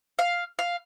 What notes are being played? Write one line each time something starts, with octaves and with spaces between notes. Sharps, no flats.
F5
F5